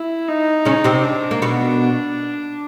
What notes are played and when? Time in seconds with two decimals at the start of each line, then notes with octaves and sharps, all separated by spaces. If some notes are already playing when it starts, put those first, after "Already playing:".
Already playing: E4
0.29 D#4
0.65 C#3 C#4
0.84 C3 C4
1.03 D4
1.31 A#3
1.42 B2 B3